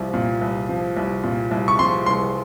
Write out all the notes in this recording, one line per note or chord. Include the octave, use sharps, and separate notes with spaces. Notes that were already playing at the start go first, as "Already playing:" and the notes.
Already playing: C2 F3
A#2
C2
F3
C2
A#2
C2
C#6
F3 C6
C2 C6